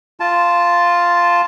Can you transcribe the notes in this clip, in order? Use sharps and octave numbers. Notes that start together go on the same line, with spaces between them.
F4 A5